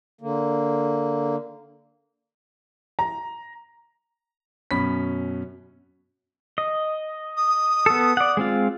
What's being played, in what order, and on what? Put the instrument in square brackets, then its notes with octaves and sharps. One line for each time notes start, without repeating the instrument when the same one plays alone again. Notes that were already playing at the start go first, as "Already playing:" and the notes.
[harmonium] D3 A#3
[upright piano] A#5
[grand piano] F#2 B2 C#4 B5 B6
[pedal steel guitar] D#5
[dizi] D#6
[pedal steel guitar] B3 A4
D5 F#5
G#3 C4 F4